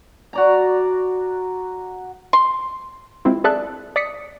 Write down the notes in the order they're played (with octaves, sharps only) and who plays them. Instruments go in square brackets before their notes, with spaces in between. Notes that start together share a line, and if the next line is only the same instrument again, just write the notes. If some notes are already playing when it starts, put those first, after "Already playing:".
[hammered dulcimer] F#4 D5 A#5
[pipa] C6
[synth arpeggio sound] G#3 C4 E4 F4
G#4 A4 D5 E5 A5 F#6
D5 D#6 B6 C#7